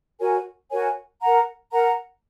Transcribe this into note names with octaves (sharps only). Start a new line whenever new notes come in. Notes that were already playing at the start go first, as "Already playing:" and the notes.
F#4 A#4 C#5 G#5
F#4 A#4 C#5 G#5
A#4 F#5 A#5
A#4 F#5 A#5